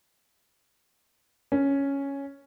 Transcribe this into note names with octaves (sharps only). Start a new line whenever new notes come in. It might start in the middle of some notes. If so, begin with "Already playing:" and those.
C#4